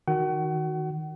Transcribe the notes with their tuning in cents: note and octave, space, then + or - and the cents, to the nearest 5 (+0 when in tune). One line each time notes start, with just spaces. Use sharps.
D#3 +0 F#4 +0 F#5 +40